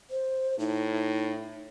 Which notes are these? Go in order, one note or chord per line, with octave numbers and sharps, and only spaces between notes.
C5
A2 D#4